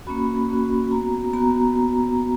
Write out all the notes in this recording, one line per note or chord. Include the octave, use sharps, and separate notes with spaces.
A#3 C#4 F#4 B5
A#3 C#4 F#4
B3 F#4 A#5
B3 F#4 A#5